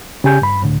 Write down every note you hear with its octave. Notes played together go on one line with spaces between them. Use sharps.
C#3 G4 G#5 G6
G2 B5
C#2 A2 D3